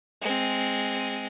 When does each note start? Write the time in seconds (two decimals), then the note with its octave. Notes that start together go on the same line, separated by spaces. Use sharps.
0.21 G#3 C4